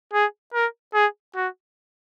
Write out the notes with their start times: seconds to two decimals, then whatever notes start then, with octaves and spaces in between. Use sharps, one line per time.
0.13 G#4
0.54 A#4
0.94 G#4
1.35 F#4